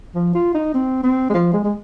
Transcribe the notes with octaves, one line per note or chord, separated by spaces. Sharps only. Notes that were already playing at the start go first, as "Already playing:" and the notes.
F3
F4
D#4
C4
C4
G#3
F3
G#3
G#3